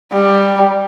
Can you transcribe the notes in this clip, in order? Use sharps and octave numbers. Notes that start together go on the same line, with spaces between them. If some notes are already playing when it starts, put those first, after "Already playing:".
G3